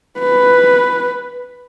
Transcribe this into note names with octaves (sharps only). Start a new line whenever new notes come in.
B4